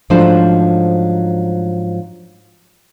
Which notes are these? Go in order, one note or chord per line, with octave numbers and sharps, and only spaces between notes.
G#2 F3 F#3 A3 D4 C5